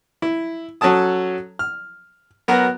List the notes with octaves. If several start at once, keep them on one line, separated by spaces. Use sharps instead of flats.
E4
F#3 C#4 A4 A5 D#6
F6
F#3 B3 F#4 A#4